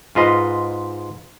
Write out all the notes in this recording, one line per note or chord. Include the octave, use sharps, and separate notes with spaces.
G#2 F4 B4 D#5